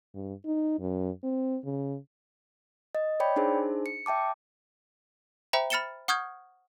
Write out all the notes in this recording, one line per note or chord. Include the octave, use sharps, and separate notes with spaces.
G2
D#4
F#2
C4
C#3
D#5
C#5 D5 G5 B5
D4 D#4 G#4 C5
C#7
E5 G5 A5 D6
C5 E5 G5 A#5 B5
B5 F6 A6 C#7 E7 G7
F#5 C#6 D#6 F6 G6 G#6